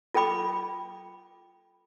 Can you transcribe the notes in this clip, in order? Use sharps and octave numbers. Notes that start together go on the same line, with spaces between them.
F4 A4 G5 B5 D6